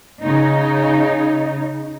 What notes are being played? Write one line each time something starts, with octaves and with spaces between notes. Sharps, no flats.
C#3 D#4